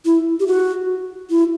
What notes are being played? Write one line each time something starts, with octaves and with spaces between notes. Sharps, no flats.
E4
G4
F#4
E4